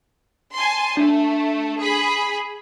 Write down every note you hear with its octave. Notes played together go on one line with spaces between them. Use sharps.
G#5 A5 C6
A3 D4
G#4 B5